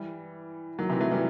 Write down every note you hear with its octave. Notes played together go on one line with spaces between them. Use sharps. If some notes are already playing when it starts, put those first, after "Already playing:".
Already playing: E3 G3
D#3 F#3
C3 E3
F#3 A3
E3 G3